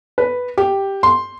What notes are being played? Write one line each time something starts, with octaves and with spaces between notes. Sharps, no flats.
B4
G4
C6